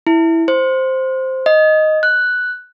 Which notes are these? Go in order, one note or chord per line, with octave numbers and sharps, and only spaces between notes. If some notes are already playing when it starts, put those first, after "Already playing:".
E4
C5
D#5
F#6